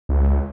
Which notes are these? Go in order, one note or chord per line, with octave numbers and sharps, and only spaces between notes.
C#2